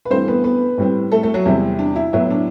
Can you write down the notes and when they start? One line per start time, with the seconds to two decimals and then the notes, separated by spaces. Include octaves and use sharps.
0.05 B4
0.11 G2 E3 A3 C4 C5
0.28 B3 B4
0.44 B3 B4
0.78 A2 G3 C4
1.12 A3 A4
1.23 A3 A4
1.34 F#3 F#4
1.45 E2 C3 G3 C4 E4
1.79 D4
1.96 E4
2.13 A2 F#3 B3 E4
2.30 D4